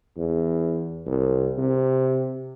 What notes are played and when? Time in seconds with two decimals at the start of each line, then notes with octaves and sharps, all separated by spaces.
0.17 E2
1.06 C2
1.58 C3